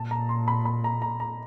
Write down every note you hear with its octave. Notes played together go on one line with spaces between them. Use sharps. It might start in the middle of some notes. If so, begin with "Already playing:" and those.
Already playing: A#2 A5
A#5
C6
B5
B5
A#5
A#5
A#5